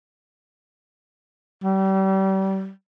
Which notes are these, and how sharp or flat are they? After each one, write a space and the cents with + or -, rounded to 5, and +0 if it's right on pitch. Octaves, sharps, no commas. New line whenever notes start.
G3 -30